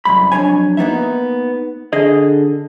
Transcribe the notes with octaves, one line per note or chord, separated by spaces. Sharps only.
C2 F#2 B5
F2 F#3 D4 C#5 G#5
A#3 B3 D#4 E5
D3 G#4 D#5